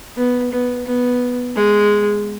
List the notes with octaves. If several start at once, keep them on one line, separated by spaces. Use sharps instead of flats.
B3
B3
B3
G#3